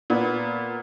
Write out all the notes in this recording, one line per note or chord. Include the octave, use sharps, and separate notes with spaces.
A#2 B3